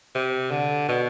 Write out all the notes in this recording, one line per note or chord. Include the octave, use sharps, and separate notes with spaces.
C3
D3
B2